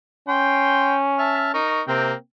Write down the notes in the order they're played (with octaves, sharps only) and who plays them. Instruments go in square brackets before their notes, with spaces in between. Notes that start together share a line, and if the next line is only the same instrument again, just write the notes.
[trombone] C#4 [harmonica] G5 C6
[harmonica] E5 A5 F6
D#4 A#4 C#6
[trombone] C3 [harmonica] A#3 C4 G5